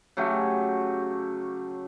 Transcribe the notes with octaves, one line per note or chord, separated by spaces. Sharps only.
C#3 F#3 A3 G4